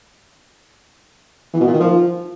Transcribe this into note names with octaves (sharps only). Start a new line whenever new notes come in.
E3
B2
A#2
D#3
F3